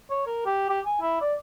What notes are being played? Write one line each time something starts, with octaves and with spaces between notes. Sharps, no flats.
C#5
A#4
G4
G4
G#5
E4
D5